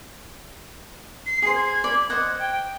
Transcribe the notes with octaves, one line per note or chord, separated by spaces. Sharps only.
C7
G#4 C5 C7
G#6
D5 B5
C5 D#5 F#5 G#6
G5